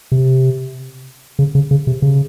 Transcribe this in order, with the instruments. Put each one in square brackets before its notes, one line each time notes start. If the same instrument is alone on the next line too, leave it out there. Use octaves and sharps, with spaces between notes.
[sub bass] C3
C#3
C#3
C#3
C3
C#3